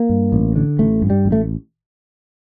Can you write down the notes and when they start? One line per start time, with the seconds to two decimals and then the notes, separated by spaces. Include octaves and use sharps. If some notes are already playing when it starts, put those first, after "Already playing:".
Already playing: A#3
0.09 G2
0.32 A1
0.56 D3
0.79 A1 A3
1.02 G2
1.10 G3
1.26 A1
1.32 A3